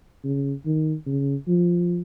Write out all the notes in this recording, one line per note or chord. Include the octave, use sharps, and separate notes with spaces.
C#3
D#3
C#3
F3